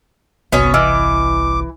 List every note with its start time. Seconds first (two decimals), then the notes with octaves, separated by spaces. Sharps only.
0.52 G1 C2 B3 C#4 F#4 C#5
0.74 E3 D#5 D6 E6 F6